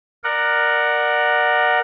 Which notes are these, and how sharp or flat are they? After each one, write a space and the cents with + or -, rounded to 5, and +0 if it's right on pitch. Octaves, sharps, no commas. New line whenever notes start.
A#4 +0 D5 +25 F#5 +0